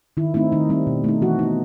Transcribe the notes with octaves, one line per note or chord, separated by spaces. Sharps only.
D#3 E4
A3 C4 D#4 E4
D#3 D#4
G3 C4 D#4
B2
A3 D#4
E3 F#4
B3 D#4